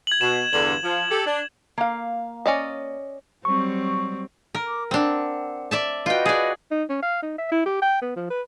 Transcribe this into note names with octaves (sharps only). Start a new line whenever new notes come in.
G#6 F#7
B2 E7
E2 G2 D3 F#7
F3
G4 A4
D4
A#3 F5
C#4 D5 D#5
F#3 G3 C4 C#6
A#4
D6
C4 D4 F#5
D5 E5 A5
F4 F#4 B4 D#5 G5
G#4 D5
D#4
C#4
F5
D#4
E5
E4
G4
G5
B3
F3
B4